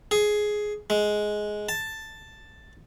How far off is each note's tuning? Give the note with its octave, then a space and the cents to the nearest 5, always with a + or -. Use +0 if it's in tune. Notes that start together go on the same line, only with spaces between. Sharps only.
G#4 +10
G#3 +10
A5 +5